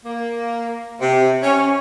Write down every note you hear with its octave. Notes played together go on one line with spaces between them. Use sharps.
A#3
C3
C#4